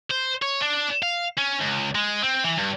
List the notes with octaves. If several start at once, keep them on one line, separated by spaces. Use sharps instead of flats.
C5
C#5
D4
F5
C#4
C#2
G#3
C4
E3
G2